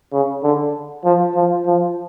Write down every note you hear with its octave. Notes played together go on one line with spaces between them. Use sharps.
C#3
D3
F3
F3
F3